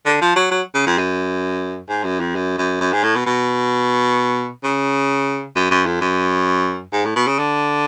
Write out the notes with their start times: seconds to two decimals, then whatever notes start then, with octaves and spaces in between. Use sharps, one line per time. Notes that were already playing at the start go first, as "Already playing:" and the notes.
0.06 D3
0.21 F3
0.36 F#3
0.51 F#3
0.74 C#3
0.86 F2
0.98 F#2
1.89 G#2
2.04 F#2
2.20 F2
2.35 F#2
2.58 F#2
2.81 F#2
2.92 G#2
3.03 A2
3.16 B2
3.26 B2
4.64 C#3
5.56 F#2
5.71 F#2
5.86 F2
6.01 F#2
6.93 G#2
7.05 A2
7.16 B2
7.27 C#3
7.39 D3